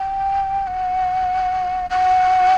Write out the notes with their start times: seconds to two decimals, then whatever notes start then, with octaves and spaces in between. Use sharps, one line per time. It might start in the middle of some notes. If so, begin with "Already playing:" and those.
Already playing: G5
0.67 F#5
1.90 F#5